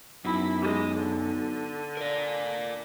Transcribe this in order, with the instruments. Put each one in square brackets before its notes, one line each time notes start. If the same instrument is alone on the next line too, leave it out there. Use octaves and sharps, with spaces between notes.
[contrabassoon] B1 [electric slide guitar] F#2 [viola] E4 B5
[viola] G#3
D3
[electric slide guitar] A#4 D5